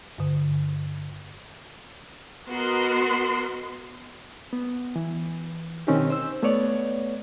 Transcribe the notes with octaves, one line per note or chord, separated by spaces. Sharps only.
G2 D3
B3 F#4 A#4 D#5 C6
B3
E3
B2 D#3 C4 C#4 D#4 G4
C5 E6
A3 B3 B4 C#5 D5